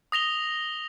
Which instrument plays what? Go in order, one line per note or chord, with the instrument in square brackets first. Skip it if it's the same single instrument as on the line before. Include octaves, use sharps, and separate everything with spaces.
[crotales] D#6 A#6 F7 G7